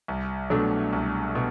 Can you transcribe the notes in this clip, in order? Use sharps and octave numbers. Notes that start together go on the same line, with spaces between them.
C2
B2 F#3 A3 D4
C2
B2